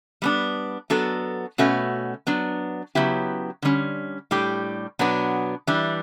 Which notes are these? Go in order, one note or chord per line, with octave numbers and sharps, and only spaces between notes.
G3 B3 D4
F#3 B3 D4 F#4 A4
B2 A3 C#4 F#4 B4
F#3 B3 D4
C#3 F#3 B3 E4 G4
D3 G3 C#4
A2 G3 D4 G4
B2 F#3 B3 D4
E3 G3 D4